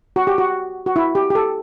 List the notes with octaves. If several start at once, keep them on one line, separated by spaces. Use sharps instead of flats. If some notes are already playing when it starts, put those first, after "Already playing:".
F#4
G4
F#4
F#4
E4
G4
G4
A4